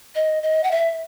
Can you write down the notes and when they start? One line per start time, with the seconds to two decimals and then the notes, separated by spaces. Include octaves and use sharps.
0.15 D#5
0.43 D#5
0.64 F#5
0.71 E5